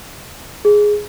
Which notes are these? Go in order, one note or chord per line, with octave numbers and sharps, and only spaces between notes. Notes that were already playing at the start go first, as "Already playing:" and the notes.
G#4